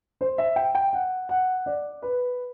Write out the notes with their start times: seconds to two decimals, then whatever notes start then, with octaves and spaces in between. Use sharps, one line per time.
0.21 C5
0.38 E5
0.56 G5
0.75 G5
0.93 F#5
1.29 F#5
1.66 D5
2.02 B4